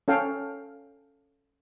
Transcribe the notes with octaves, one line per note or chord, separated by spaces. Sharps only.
C#4 A4 F5 G5